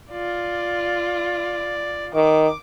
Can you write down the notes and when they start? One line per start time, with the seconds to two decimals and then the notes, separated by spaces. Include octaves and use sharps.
0.11 F4 D5
2.15 D#3 D6